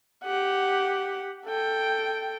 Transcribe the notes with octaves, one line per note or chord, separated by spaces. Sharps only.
G4 F#5
A4 G5